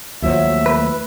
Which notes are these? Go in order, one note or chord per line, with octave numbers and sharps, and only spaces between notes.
D#2 F3 F#3 A3 E5
B4